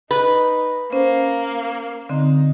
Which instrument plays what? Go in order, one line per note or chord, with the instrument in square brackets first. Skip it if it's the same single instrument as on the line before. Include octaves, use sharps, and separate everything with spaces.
[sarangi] D#4 [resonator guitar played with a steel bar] B4
[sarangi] A#3 [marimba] C#4 C5
[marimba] D3 C4 [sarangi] D#4